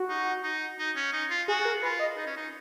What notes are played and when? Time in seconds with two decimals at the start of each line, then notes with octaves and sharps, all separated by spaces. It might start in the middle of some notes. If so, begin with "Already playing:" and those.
Already playing: F#4
0.09 D#4
0.43 D#4
0.79 D#4
0.96 C#4
1.13 D#4
1.30 F4
1.48 F#4 G#4
1.65 A#4
1.82 F4 B4
1.99 D#5
2.17 D#4
2.26 C#4
2.37 D#4